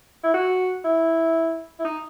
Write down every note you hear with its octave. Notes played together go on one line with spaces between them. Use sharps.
E4
F#4
E4
E4
D#4